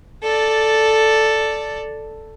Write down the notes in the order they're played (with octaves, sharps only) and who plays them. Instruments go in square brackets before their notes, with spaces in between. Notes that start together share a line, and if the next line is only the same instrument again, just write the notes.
[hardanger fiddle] A4 D5